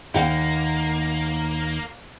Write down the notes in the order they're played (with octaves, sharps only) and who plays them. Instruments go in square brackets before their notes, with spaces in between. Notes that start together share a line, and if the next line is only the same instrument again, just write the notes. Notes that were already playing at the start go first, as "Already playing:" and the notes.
[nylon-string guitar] D#2 F#5 G5 [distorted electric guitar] A#3